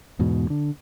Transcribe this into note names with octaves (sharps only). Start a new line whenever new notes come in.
E2 G#2 B2
D3